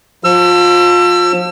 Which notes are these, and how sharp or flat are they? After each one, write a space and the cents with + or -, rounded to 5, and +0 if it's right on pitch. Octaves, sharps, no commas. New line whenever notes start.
F3 +25 E6 +35